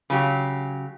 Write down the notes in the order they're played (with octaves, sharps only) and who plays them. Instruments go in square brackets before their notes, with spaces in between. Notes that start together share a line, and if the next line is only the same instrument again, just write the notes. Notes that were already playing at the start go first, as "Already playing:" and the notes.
[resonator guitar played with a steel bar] C#3 F#3 G4